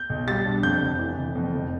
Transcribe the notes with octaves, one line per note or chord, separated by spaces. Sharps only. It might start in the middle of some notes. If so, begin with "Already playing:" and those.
Already playing: G6
B1
G3 A6
D4
F2 G6
F1
E3
F1
F2
F1